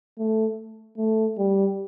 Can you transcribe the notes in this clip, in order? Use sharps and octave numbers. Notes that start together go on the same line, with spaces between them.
A3
A3
G3